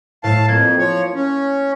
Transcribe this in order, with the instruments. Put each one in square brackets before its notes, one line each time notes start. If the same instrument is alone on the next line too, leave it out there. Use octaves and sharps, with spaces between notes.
[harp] A2 A3 [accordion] F5 A5
[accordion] F2 [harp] A#3 G#6
[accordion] F3 C#5
C#4